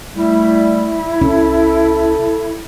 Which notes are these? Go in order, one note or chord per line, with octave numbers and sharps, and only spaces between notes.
G3 A3 E4
C2 C#4 A4